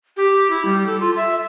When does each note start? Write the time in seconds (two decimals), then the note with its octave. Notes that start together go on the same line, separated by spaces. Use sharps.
0.17 G4
0.50 E4
0.65 G3
0.86 A4
1.00 F4
1.16 E5